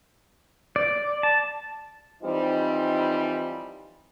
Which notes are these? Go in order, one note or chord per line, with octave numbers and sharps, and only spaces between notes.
D5
A5
E3 F3 G3 C4 D#4